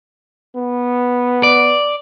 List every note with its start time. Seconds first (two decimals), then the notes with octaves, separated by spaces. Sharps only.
0.56 B3
1.43 D5